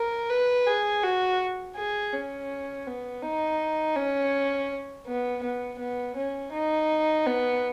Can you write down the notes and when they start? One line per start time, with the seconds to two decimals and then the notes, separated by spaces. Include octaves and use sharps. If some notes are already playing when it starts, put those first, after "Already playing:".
Already playing: A#4
0.29 B4
0.67 G#4
1.03 F#4
1.76 G#4
2.13 C#4
2.87 B3
3.22 D#4
3.95 C#4
5.07 B3
5.43 B3
5.79 B3
6.16 C#4
6.52 D#4
7.26 B3